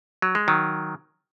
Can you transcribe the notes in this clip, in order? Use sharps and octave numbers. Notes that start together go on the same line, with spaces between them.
F#3
G#3
D#3 F#3